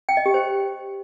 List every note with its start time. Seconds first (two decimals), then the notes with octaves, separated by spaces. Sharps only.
0.09 G5
0.17 D#5
0.26 G4
0.34 C5